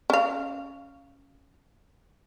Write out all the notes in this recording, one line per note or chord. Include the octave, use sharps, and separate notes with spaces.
C#4 F5